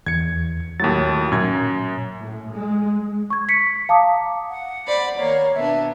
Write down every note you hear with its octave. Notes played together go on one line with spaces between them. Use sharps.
E2 G#6 C#7
D#2 A2 F#3 A6
F#2 A#2 G#6
A2
G#3
C#6 G#6
B6 C#7
F5 A5 A#5 D6 D#6
F#5
C5 D5 B5
D#3 A#3 A#4 C#5
B2 B3 D4 E5